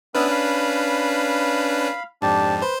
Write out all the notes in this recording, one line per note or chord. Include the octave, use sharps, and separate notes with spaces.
B3 C#4 D4 B4 E5 F6
F5 B5
F2 G#2 D4 G4 A5
B4 C5